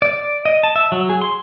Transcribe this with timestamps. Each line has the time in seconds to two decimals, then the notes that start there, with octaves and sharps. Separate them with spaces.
0.02 D5
0.45 D#5
0.63 A5
0.76 E5
0.92 F#3
1.09 G#4
1.22 C6